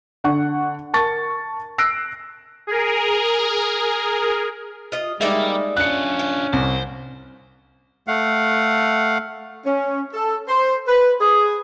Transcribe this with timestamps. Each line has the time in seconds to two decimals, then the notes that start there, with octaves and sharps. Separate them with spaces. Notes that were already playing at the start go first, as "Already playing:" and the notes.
0.24 D3 F#5 C#6
0.93 A#4 A5 C#6 A6
1.78 E6 F#6 A#6 C7 D7
2.67 G#4 A#4
4.92 F4 D#5
5.21 G3 G#3 A#3 D#4 D5 E5
5.77 C#4 D4 F4 F#6 C#7
6.19 G5
6.53 C2 C5
8.08 A3 F5 F#5
9.66 C#4
10.14 A4
10.48 C5
10.88 B4
11.21 G#4